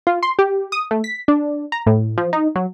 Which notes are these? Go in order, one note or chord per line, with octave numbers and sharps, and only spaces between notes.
F4
C6
G4
D#6
A3
B6
D4
A#5
A2
F3
D#4
F#3